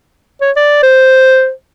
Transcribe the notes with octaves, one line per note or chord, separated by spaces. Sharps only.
C#5
D5
C5